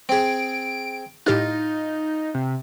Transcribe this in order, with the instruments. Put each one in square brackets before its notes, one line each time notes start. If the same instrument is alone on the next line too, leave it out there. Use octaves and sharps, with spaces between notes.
[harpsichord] C4 G#4 [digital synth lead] D7
[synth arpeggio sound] A2 G4 F6 [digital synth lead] D#4 [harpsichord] F4
[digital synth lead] C3